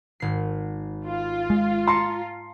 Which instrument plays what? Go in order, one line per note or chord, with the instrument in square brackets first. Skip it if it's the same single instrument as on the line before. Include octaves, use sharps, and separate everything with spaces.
[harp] G#1 C7
[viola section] F4
[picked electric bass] G#3
[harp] A5 A#5 C#7 [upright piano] C6